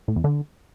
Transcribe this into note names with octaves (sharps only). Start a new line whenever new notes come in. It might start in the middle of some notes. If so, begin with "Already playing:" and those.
A2
E2
D3